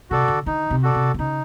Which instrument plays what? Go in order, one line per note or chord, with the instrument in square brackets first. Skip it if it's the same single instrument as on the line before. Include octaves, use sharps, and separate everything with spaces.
[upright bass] C3 [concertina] F#4 A4 D5
[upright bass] D3
[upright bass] D3 [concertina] D#4
[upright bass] C3
[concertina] F#4 A4 D5
[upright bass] C3
C3
[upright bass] C#3 [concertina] D#4